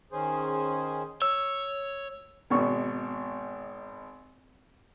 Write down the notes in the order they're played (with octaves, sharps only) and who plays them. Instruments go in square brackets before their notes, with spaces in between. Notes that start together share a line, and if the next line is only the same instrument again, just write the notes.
[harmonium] D#3 C#4 G#4 C5
[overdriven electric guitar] C#5 [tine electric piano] E6
[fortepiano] G#1 B2 C#6